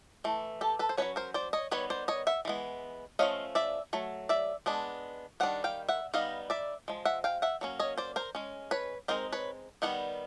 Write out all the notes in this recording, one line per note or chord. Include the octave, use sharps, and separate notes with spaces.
E3 A3
G4 A4
A4 B4
C5
F#3 A3 C#4 B4 C#5
A#4 C5
C5 D5
C#5 D#5
D#3 G3 B3 B4 C#5
C5 D5
C#5 D#5
E5 F#5
E3 G#3 B3
F3 A3 C#4 D#5 F5
D5 E5
F#3 A3
D5 E5
G#3 B3 D4
D#3 G3 D4 F#5
F5 G5
E5 F#5
G3 B3 D#4 D#5 F5
D5 E5
F3 G#3
E5 F#5
F5 G5
E5 F#5
F#3 A#3 C#4
C#5 D#5
C5 D5
A#4 C5
G#3 C#4
B4 C#5
G#3 C4 D#4 A#4 C5
B4 C#5
D#3 G3 B3 F#5